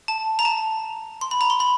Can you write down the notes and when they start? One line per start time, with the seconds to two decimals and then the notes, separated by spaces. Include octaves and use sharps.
0.08 A5
0.39 A#5
0.45 A5
1.21 C6
1.31 B5
1.41 A#5
1.50 C6
1.60 B5